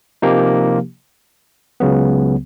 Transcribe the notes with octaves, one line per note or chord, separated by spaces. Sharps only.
C3 F3 A#3 D#4 G4
C#2 C#3 F#3 B3